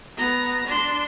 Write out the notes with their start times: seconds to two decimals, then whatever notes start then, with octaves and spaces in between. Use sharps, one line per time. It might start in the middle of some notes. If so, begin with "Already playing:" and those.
0.17 B3 A#5
0.66 D4 C6